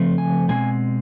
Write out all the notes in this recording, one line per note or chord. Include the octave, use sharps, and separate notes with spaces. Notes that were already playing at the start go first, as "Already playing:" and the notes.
Already playing: C#3 F3 A3 C4
G#5
B2 G#3 C4 G#5